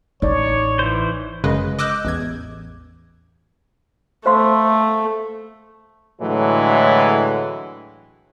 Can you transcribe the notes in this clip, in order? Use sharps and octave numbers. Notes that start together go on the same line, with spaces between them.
A1 D#4 C#5 D5
E3 C5
G1 F#2 C#3 G#3 B4 D#5
D#5 D6 E6 F#6 G6
A1 E2 G#6
A3 C5 F5 C6
A2 D3 E3 F#3 G#3